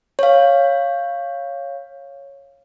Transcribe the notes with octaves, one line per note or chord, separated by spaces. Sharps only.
C#5 F5